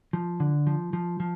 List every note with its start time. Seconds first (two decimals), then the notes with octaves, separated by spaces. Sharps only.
0.13 F3
0.40 D3
0.67 F3
0.93 F3
1.20 F3